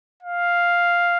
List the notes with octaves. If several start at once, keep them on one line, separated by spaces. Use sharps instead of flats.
F5